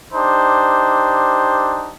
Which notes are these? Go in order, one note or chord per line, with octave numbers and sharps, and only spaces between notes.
D4 D#4 G4 C5